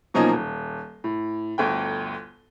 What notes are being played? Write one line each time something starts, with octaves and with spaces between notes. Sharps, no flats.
B2 F3 F#3 A#3 C#4 D#4
D#1
A2
G1 D2 G5